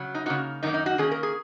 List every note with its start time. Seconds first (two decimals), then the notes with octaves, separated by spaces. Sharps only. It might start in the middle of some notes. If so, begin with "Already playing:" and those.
Already playing: C#3 F#3
0.15 D#4
0.26 C#3 A#3 D#4 F#4
0.63 F#2 D#3 A#3 D#4
0.74 D#4
0.86 F#4
0.98 D#3 A#3 C#4 G#4
1.11 A#4
1.23 G#4